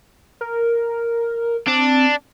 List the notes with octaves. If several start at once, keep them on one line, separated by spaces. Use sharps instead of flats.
A#4
C4 D4